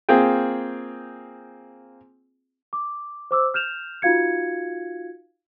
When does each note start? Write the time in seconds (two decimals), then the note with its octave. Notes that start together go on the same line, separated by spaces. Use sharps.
0.09 A#3 C4 F4 G#4 G5
2.73 D6
3.31 C5 D6 E6
3.54 F6 G6 E7 F7
4.02 D#4 F4 F#4 F5 G#6 C#7